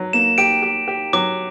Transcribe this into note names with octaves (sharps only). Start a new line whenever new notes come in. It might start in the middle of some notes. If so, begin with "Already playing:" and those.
Already playing: F#3
A#3 E7
G4 D7
G4
G4
F#3 D6